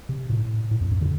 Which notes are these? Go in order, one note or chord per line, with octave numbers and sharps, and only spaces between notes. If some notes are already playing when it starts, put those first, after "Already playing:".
C3
A2
A2
F2
F2
D3